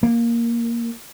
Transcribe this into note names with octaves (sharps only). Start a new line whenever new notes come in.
A#3